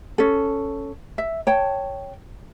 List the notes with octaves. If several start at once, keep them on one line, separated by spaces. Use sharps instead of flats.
C#4 A4
E5
C#5 G5 A5